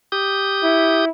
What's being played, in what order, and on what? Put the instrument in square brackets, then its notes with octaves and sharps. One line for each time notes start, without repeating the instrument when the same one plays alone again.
[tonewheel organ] G4 D#6 G6
[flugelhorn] E4